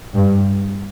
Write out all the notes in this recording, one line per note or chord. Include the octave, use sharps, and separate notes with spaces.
G2